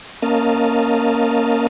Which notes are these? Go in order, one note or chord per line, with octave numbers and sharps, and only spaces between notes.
A#3 C#4 A#4 D#5 F5 A5